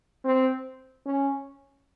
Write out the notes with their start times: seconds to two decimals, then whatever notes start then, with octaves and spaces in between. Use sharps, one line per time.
0.24 C4
1.06 C#4